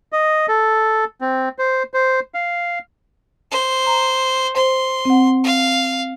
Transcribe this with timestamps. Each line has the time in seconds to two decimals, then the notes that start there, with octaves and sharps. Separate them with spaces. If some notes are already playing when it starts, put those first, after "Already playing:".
0.12 D#5
0.48 A4
1.21 C4
1.59 C5
1.94 C5
2.34 F5
3.51 C5
3.86 A#5
4.56 C5 C6
5.05 C4 F#5
5.44 F5